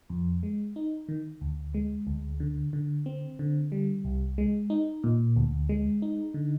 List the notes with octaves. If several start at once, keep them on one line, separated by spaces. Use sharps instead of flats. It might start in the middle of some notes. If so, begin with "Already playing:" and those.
F2
G#3
D#4
D#3
D2
G#3
D2
D3
D3
C4
D3
G3
C2
G#3
D#4
A#2
D2
G#3
D#4
D3